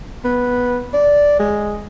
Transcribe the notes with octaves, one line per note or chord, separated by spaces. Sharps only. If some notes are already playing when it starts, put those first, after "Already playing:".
B3
D5
G#3